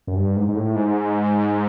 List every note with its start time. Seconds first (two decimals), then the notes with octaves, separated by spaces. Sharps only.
0.07 F#2
0.16 G2
0.36 G#2
0.48 G#2
0.56 A2
0.76 G#2